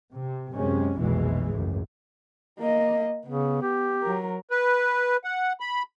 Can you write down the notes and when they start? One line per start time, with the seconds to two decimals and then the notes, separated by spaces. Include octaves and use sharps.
0.13 C3
0.53 F#2 C3 G#3 C#4
0.97 F1 B1 E2 B2 E3 G#3
1.50 G#1 C#2 F#2 A2
2.59 A#3 D#5
3.26 C#3 B3
3.62 G4
4.03 F#3 A#4
4.51 B4
5.24 F#5
5.60 B5